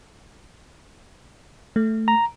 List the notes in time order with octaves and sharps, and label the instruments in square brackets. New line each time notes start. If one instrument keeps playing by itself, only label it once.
[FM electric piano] A3
[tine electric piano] A#5